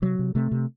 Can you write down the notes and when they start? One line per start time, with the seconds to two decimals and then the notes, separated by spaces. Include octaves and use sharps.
0.02 C3 F#3
0.19 C3
0.35 C3 A3
0.51 C3